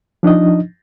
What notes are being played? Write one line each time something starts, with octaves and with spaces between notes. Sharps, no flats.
F3 D4 D#4 D#5